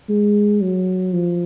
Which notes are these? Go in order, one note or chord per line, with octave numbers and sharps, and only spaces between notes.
G#3
F#3
F3